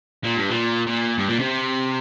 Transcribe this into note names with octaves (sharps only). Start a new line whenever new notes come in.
A#2
G2
A#2
A#2
G2
A#2
C3